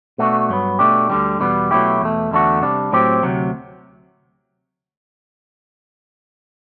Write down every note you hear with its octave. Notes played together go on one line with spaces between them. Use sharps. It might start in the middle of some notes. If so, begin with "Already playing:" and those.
B2 A3 D4 F#4
G2 F#3 B3
B2 A3 D4 G4
D2 D3 G3
E2 B2 G3 B3
B2 F#3 A3 E4 G4
E2 B2 A3
E2 D3 A3 D4 F#4
C3 G3 D4
A2 F#3 C4 G4
D2 C3 F#3